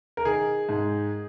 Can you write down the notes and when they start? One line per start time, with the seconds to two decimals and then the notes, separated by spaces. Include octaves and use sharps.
0.17 A#4
0.25 D#3 G#4
0.69 G#2